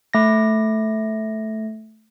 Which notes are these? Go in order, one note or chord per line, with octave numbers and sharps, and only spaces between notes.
A3 A#6